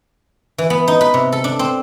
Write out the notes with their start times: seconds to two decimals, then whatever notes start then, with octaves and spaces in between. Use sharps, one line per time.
0.58 E3
0.70 B3
0.88 D#4
1.01 B4
1.14 C3
1.32 A4
1.44 D4
1.59 C4